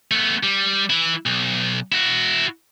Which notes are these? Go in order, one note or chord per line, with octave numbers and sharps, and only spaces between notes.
A3 B3
G3
E3 E4
B1
E4 F#4